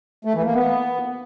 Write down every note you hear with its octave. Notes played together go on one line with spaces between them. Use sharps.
A3
E3
A#3
B3